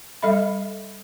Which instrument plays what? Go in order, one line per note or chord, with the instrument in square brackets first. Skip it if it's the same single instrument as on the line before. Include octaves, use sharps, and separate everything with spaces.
[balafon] G3 A4 D#5 E5 B5